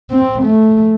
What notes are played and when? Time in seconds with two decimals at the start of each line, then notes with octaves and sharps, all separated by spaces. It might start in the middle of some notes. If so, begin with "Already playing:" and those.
0.10 C4
0.43 A3